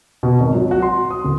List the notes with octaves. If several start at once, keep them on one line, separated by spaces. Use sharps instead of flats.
B2
G#1
F#3
F#4
C6
D#6
D1